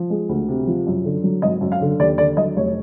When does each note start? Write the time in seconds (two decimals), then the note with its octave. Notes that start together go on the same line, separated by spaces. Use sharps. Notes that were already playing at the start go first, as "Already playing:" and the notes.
Already playing: F3
0.10 G#3
0.29 D2
0.48 C3
0.67 F3
0.87 F#2
1.04 D3
1.24 F#3
1.42 G#1 D#5
1.61 F#2
1.72 F5
1.81 D3
1.99 D#2 D5
2.18 D3 D5
2.37 F#3 D#5
2.56 F1 C#5